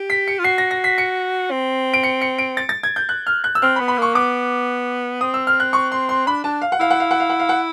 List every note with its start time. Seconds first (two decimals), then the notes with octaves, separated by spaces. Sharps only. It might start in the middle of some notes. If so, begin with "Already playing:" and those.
Already playing: G4
0.10 B6
0.28 C#7
0.39 F4
0.44 F#4 C7
0.58 A#6
0.71 A#6
0.84 B6
0.98 C#7
1.51 C4
1.94 D7
2.03 C#7
2.21 C#7
2.38 D7
2.57 A6
2.69 A6
2.83 G#6
2.96 G6
3.09 F#6
3.27 F6
3.44 F#6
3.55 E6
3.62 C4 F6
3.76 B5
3.80 B3
3.88 B5
3.98 A#3 C#6
4.14 B3 D6
5.21 C4 D#6
5.34 E6
5.47 F6
5.60 F#6
5.73 C#6
5.92 C6
6.09 C6
6.27 D4 B5
6.44 D4 A5
6.62 F5
6.72 F#5
6.80 E4 F5
6.90 F#5
7.00 F5
7.11 F#5
7.20 F5
7.30 F#5
7.40 F5
7.49 F#5